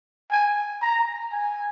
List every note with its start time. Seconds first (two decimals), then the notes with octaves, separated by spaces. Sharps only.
0.31 G#5
0.82 A#5
1.32 G#5